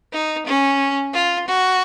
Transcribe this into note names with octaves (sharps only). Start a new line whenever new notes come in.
D#4
C#4
F4
F#4